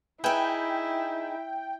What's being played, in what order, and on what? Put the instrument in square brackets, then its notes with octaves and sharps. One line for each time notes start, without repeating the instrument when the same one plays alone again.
[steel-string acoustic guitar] D#4 G#4 [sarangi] E4 [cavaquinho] B4 E5 G#5 [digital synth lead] G5